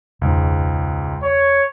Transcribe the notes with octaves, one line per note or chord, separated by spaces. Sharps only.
E1 C#2 G#2
C#5